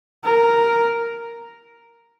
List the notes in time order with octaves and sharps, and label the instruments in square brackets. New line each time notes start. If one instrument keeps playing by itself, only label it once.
[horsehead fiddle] A#4